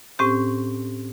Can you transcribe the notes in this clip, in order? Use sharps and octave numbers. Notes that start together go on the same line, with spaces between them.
A2 C4 C#4 G4 C5